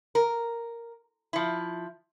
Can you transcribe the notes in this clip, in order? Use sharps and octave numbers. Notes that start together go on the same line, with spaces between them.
A#4
F3 E4